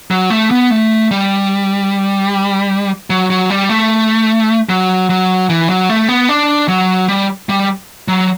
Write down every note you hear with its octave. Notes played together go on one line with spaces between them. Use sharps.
F#3
A3
B3
A3
G3
F#3
F#3
G3
A3
F#3
F#3
E3
F#3
A3
B3
D4
F#3
G3
G3
F#3